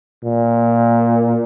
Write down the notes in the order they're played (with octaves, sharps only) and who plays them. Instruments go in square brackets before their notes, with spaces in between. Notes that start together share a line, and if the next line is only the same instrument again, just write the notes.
[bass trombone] A#2